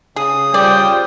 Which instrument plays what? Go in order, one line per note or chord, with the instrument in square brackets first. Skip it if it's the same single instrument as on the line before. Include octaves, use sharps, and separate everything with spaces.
[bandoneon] C#3 D#6 [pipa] G#4
[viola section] G3 F4 C5 [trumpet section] C#4 G5 [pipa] D5